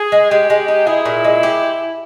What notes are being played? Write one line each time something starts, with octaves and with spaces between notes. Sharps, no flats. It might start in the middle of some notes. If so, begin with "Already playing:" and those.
Already playing: G#4
G#3
G#3 G4
G#3
D#4
E4 G#4
A#2
G#3
G4